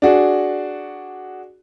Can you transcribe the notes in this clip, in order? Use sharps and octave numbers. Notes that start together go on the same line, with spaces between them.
D4 F#4 G#4